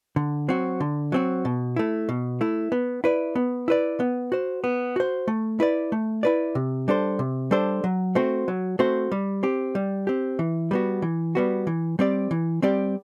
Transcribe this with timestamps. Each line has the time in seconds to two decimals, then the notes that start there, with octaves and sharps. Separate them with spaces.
0.16 D3
0.48 F#3 C4 F#4
0.80 D3
1.12 F#3 C4 F#4
1.45 B2
1.76 A3 E4
2.09 B2
2.41 A3 E4
2.72 B3
3.04 E4 B4 D5
3.35 B3
3.68 E4 B4 D5
4.00 B3
4.32 F#4 C5
4.64 B3
4.96 F#4 C5
5.28 A3
5.60 E4 B4 D5
5.92 A3
6.23 E4 B4 D5
6.55 C3
6.88 G3 D4 A4 C5
7.19 C3
7.51 G3 D4 A4 C5
7.84 F#3
8.15 A3 C4 F#4 C5
8.48 F#3
8.79 A3 C4 F#4 C5
9.12 G3
9.43 C4 G4
9.75 G3
10.07 C4 G4
10.39 E3
10.71 G3 B3 F#4
11.02 E3
11.35 G3 B3 F#4
11.67 E3
11.99 G3 C4 G4 D5
12.31 E3
12.62 G3 C4 G4 D5